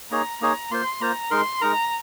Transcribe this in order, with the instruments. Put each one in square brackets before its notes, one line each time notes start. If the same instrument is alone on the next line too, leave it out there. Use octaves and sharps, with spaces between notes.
[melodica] A#3 D#4 G#4 C#5 [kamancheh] A#5
[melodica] A#3 D#4 G#4 C#5 [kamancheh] A#5
[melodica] A#3 F4 C5 [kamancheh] C6
[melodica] A#3 F4 C5 [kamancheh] A#5
[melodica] G#3 D#4 A#4 [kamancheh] C6
[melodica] G#3 D#4 A#4 [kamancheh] A#5